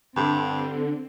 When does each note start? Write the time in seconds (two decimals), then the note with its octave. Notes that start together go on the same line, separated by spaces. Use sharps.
0.16 G2 D3 C4